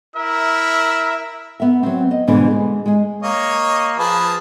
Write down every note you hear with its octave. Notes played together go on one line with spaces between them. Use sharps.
E4 A#4 E5
B3 E5
F#3 C4
D#5
G#2 B2 D3 E3 G3 D4
G#3 G#4
G#3 G#4
A#3 C#5 D#5
F3 G#4 B4 A5